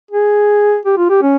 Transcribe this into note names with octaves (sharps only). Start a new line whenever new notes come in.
G#4
G4
F4
G4
C#4